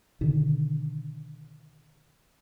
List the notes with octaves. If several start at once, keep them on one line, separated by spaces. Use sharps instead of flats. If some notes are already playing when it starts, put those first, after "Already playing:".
B2 D3 D#3